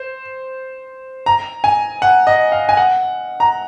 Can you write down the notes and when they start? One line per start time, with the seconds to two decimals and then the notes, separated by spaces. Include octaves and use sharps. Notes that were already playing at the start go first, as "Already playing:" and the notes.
Already playing: C5
1.26 A#5
1.64 G#5
2.02 F#5
2.27 D#5
2.52 F5
2.69 G#5
2.77 F#5
3.40 A#5